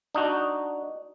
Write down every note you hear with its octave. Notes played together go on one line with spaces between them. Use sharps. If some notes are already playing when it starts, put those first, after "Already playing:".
D4 D#4 F#4